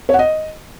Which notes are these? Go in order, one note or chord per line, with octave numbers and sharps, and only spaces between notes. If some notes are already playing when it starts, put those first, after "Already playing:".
C#5
F#5
D#5